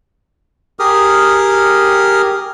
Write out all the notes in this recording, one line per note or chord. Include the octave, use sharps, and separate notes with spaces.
G4 G#4 A#4 D#6 F6